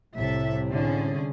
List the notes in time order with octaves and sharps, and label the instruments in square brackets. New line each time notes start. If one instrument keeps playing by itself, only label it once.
[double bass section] C2 C3 [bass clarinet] A2 [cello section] A4 E5
[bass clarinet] A2 [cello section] D3 C#4 G#4